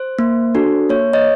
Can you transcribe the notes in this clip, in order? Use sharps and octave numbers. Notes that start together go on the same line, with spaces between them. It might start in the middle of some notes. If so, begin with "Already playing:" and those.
Already playing: C5
A#3
D4 F#4 A4
A#3 C#5
C#5 D#5